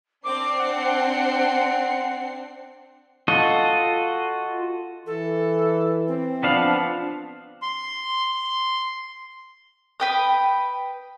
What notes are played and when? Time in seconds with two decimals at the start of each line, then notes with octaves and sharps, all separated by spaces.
0.24 C4 D4 D6 C7
0.59 F#5
3.28 F4 F#4 A4 D#5
5.07 E3 A4
6.08 C4
6.43 F3 B3 D4 F5
7.62 C6
10.00 B4 G5 D#6